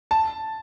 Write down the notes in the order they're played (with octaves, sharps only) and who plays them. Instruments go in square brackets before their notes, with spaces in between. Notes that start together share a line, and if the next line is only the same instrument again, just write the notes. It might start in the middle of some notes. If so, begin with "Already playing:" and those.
[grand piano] A5